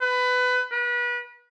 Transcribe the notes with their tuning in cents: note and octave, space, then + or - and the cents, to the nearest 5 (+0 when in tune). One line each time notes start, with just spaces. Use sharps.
B4 +20
B4 -30